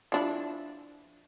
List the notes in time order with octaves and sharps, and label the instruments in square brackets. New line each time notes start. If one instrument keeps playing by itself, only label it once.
[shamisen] F3 D4 E4